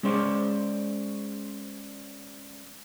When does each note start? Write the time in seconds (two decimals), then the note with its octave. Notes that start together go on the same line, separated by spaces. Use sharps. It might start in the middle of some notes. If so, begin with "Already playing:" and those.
0.03 G#3 C#4 C5 D5